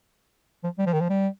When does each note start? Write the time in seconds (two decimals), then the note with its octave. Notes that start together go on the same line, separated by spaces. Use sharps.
0.64 F3
0.78 G3
0.86 F3
0.93 D#3
1.00 F3
1.09 G3